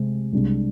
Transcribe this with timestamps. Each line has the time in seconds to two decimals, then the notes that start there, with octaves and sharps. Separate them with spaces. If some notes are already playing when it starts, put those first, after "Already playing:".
Already playing: C3 G#3 C4
0.33 C2 C3 G#3 D4